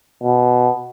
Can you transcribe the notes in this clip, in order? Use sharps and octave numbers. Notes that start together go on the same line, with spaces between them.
B2